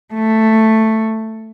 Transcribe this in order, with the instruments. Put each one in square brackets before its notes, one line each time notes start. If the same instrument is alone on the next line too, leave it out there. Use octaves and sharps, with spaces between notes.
[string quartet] A3